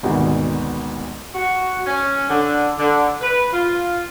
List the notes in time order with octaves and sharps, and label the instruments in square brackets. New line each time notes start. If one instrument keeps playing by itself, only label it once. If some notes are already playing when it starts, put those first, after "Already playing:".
[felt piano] G#1 D2 G#2 B2 D#3
[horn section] F#4
C#4
D3
D3
B4
F4